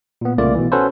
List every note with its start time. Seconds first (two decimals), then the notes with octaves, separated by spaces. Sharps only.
0.21 A#2 B3
0.38 C2 C#3 A3 A#3 F4 D5
0.55 B2 E3
0.72 C#4 F#4 A4 B4 C5